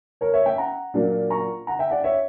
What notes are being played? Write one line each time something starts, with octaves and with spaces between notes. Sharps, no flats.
A#4 C#5
C#5 E5
E5 G5
F#5 A#5
A#2 F#3 A#3 D4
A#5 C#6
F#5 A#5
E5 G5
D5 F#5
C#5 E5